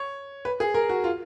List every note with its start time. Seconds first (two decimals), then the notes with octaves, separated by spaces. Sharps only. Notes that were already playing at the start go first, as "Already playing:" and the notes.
Already playing: C#5
0.45 B4
0.60 G#4
0.74 A#4
0.89 F#4
1.04 F4